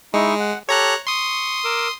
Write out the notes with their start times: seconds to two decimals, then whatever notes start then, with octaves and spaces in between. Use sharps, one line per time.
0.14 G#3 D#4 E4 C#6
0.40 F#5
0.69 G4 A4 C#5 A#5 F#6
1.07 C6 C#6 D#6
1.64 A#4 D6 E6